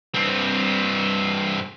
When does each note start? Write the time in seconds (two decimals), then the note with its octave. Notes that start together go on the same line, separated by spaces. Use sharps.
0.14 G2 C4